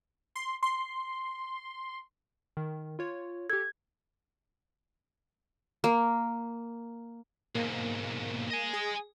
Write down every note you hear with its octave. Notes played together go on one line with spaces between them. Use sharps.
C6
C6
D#3
F4 C#5
G4 A4 G#6
A#3
B1 G#2 A#3
D#5 G#5
G#4